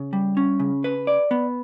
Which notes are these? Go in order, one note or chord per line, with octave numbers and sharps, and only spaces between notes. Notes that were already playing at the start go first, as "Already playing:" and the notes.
Already playing: C#3
G3
C#4
C#3
B4
D5
B3